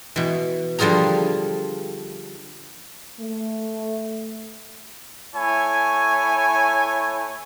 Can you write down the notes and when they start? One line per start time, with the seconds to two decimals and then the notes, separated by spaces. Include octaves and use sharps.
0.16 B2 E3
0.79 D3 F3 G3 F4 G#4 A#5
3.20 A3
5.35 A3 E4 C#5 G#5